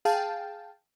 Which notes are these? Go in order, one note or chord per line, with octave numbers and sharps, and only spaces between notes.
G#4 F5 G5 A5